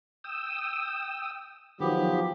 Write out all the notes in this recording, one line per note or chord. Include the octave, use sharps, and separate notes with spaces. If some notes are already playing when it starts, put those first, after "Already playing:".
G5 D#6 E6
D#3 F3 F#3 B3 G4